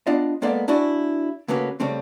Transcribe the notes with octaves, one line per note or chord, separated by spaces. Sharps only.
B3 D4 F4 D5 D#5
G#3 A#3 B3 A4 D5 F5
D4 E4 F#4 D5 G#5
C#3 A3 A#3 C#4 F#4 B4
C#3 G3 A3 C4